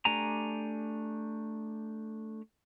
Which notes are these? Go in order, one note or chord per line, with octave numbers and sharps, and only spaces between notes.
A3 D4 G4 G#5 A#5